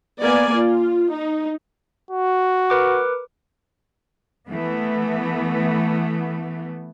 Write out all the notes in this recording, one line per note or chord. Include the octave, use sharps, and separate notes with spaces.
A#3 B3 D5 G#5
F4
D#4
F#4
A#4 B4 D6
E3 A3 B3